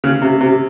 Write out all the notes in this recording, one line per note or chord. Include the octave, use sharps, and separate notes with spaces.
C#3
C3
C3